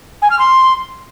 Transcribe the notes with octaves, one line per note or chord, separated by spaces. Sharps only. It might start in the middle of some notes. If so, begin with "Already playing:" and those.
G#5
F6
C6